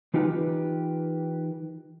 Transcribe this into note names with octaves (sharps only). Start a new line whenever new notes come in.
E3 D#4 F4 G4 A#4 B4